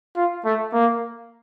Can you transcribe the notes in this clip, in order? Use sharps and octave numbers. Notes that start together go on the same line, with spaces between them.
F4
A3
A#3